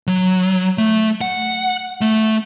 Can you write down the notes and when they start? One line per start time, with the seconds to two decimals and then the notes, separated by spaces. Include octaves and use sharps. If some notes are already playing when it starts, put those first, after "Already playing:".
0.07 F#3
0.78 A3
1.21 F#5
2.01 A3